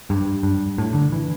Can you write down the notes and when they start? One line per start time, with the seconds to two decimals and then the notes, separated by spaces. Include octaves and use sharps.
0.10 G2
0.43 G2
0.78 A2
0.94 D3
1.12 E3